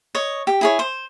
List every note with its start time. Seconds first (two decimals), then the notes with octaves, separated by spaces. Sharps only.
0.15 C#5 D#5
0.47 G4
0.61 E4 G#4 C#5
0.79 C5